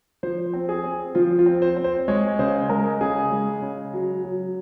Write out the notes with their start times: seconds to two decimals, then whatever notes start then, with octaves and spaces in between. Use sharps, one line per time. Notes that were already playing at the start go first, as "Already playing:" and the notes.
0.23 F3 C5
0.54 C4
0.69 G#4
0.84 C4
1.15 F3 F4
1.39 F4
1.46 C4
1.62 C5
1.77 C4
1.84 C5
2.08 G#3 C#5
2.39 C#3 C5
2.69 G#3 A#4
3.01 C#3 G#4
3.32 G#3
3.62 C#3
3.94 F#3
4.24 F#3